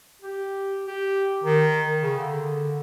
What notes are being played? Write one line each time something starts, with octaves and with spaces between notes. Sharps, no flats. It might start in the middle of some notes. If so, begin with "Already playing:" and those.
G4
G4
D#3
C#3
D3